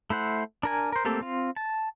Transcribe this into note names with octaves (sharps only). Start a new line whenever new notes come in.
A3 E4 C5 F#5
D4 A#4 G#5
A#4 C5
A3 A#3 C4 G4 A4
C4 F4
A5